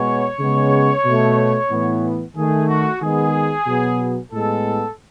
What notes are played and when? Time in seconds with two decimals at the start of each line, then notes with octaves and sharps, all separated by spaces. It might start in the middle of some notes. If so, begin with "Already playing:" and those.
Already playing: B2 G#3 B3 C#5
0.39 C#3 G#3 B3
1.05 B2 A3
1.70 A2 E3 B3
2.35 D#3 A3 G#4
2.68 F#4
3.01 D#3 G#3 B3 G#4
3.66 B2 F#3 B3
4.31 A2 G#3 B3 A4